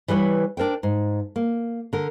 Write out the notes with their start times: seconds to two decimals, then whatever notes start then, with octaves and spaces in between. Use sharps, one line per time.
0.08 E3 G3 B4 C#5
0.57 D4 A#4 C5 G5
0.83 G#2
1.36 A#3
1.93 D3 A#4